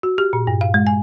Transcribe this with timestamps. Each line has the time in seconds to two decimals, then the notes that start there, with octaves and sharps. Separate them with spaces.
0.03 F#4
0.18 G4
0.33 A#2
0.47 G2
0.61 F5
0.74 G#3
0.87 G#5